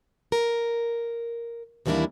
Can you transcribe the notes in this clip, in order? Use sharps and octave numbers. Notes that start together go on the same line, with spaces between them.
A#4
D#2 E3 G3 A#3 D4 E4